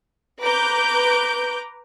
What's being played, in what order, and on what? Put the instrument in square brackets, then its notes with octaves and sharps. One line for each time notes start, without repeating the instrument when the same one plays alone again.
[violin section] B4 A#5 D6 G6 D7